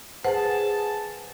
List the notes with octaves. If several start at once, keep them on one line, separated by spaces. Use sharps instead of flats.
G#4 B4 C5 F#5 A5